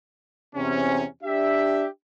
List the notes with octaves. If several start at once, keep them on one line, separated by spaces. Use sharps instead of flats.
E2 C3 C4 C#4
D4 G4 E5